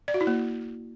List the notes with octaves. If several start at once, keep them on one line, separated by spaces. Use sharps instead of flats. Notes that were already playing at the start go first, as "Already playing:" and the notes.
D5
F#4
E4
A#3